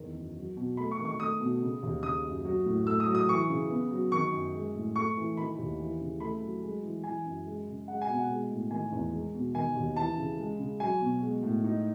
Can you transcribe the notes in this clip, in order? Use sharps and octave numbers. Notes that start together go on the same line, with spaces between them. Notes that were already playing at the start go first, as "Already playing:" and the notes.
Already playing: E2 D#3
F#2
F#3
B2
A3 B5
C#6
D#3
C#6
A3 D#6
B2
C#3
D#2
C#3 D#6
F#2
F#3
A2
A3 E6
D#6
F#3
D#6
E3 C#6
C#3
B3
F#3
D#3 C#6
F#2
G#3
A2
A3 C#6
E3
D#3 B5
D#2
E3
C#3
A3 B5
F#3
G#3
E3
E3 G#5
F#2
G#3
C#3
G#3 F#5
G#5
B2 F#5
G#3
A2
D#3 G#5
E2
G#3
B2
D#3 G#5
D#2
E3 A5
C#3
G#3
C#3
F#3 G#5
B2
G#3
A2
D#4